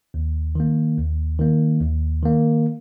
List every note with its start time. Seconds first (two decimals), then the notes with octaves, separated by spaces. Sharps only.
0.14 D#2
0.55 D#3 A#3
0.97 D#2
1.39 D#3 A#3
1.81 D#2
2.23 D#3 A#3